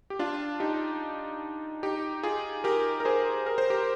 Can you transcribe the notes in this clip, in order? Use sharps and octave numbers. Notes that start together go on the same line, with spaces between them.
G4
D4 F4
D#4 G4
D#4 G4
F4 G#4
G4 A#4
A#4
G#4 C5
A#4
C5
G4 A#4